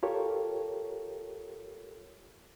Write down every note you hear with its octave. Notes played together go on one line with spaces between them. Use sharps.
F4 G4 A4 A#4 C#5